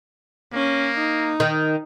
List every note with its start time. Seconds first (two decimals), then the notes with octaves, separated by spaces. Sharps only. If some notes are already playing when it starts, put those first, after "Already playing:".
0.53 A#3 C#4
0.98 D#4
1.40 D#3